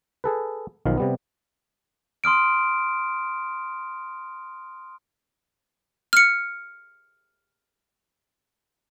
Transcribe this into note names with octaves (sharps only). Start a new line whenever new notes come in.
G#4 A4 B4
B1 D#3 F3 F5
C3 G3 B3
C6 D#6 F6 D7
F6 C#7